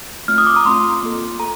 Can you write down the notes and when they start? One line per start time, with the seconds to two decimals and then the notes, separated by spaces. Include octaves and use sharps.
0.28 A3 C4 F4 F6
0.38 D#6
0.47 D6
0.56 A#5
0.65 A3 C4 F4 C6
1.03 A#3 F4 A4
1.40 A4 A#5